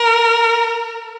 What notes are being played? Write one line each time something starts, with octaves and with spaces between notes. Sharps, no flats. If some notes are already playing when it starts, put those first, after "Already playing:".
Already playing: A#4